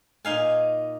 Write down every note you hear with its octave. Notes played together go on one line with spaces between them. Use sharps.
A#2 D#4 F5 G#5